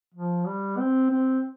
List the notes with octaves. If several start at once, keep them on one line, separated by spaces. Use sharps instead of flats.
F3
G3
C4
C4